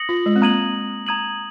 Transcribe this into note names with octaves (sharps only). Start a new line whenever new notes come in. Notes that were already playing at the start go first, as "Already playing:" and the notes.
Already playing: D#6 A#6 C#7 F#7
F4
G#3
C4
A#3 A#5 D#6 G#6 D#7 F#7
A#5 D#6 G#6 D#7 F#7